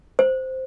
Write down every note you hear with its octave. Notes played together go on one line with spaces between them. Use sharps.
C5